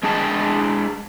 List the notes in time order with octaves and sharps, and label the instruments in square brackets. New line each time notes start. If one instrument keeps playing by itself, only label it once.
[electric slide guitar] G#3 D4 G#4 D#5 G5 A5